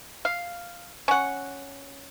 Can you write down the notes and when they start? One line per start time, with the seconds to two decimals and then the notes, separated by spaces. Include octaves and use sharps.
0.25 F5
1.08 C#4 F#5